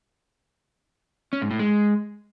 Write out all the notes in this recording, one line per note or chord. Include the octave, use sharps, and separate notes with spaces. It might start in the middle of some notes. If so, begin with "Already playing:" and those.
C#4
G#2
A2
G#3